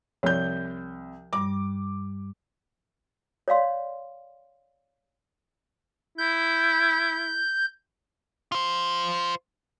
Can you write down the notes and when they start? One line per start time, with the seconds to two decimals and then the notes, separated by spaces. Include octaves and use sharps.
0.23 C2 F3 G6
1.33 G2 G3 D6
3.48 C#5 D5 F5 C6
6.18 E4 G6
8.52 F4 C5